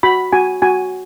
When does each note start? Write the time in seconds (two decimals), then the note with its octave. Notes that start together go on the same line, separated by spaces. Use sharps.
0.03 F#4 B5
0.33 F#4 G#5
0.62 F#4 G#5